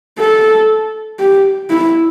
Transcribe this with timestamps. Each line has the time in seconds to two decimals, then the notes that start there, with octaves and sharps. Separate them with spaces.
0.19 A4
1.19 G4
1.70 E4